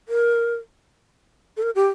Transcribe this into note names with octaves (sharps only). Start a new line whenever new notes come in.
A#4
A4
A#4
G4